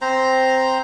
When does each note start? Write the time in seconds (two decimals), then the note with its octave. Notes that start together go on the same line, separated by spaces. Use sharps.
0.01 C4 C5 A#5